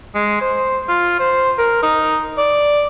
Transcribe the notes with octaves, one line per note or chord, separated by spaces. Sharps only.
G#3
C5
F4
C5
A#4
D#4
D5